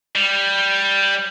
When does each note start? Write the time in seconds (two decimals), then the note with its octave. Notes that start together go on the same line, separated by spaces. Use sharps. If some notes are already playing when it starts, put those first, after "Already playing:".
0.15 G3